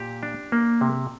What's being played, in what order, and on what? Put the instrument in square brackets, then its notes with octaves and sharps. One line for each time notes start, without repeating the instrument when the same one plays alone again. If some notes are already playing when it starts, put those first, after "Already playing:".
Already playing: [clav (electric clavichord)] A#2 G4
D4
A#3
C3